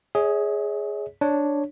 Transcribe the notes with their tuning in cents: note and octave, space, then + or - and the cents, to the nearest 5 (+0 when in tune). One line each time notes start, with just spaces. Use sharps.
G#4 +0 C#5 +20 E5 -45
D4 +0 C#5 +0